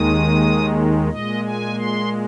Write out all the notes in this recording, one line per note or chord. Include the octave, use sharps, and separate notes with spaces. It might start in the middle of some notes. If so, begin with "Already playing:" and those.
Already playing: D#2 D#3 G#3 D#6
A#2 G#3 D#5
G#5
C6